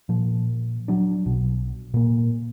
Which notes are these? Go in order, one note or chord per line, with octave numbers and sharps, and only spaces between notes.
A#2 F3
F#3 D4
B1 B2
A#2 A#3